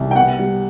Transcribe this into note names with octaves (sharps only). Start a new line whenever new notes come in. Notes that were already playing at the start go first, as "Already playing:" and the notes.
Already playing: C2
G5
B3 F#5
G3